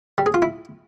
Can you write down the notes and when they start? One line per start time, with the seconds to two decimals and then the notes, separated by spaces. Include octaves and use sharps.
0.18 G3
0.26 G#4
0.34 F4
0.42 E4